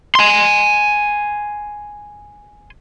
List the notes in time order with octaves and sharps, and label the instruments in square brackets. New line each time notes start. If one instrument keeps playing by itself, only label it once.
[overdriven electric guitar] G#5 C6